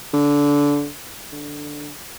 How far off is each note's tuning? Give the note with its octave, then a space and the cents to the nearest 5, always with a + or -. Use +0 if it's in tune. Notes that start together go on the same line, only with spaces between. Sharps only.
D3 -20
D3 +0